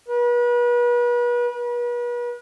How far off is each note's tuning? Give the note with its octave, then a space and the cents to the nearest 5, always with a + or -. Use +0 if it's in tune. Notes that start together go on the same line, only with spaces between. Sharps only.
B4 -35
B4 -40